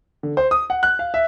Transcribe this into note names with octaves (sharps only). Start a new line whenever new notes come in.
D3
C5
D#6
F#5
F#6
F5
E5